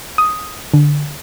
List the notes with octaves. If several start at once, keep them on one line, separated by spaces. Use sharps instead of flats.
D#6
D3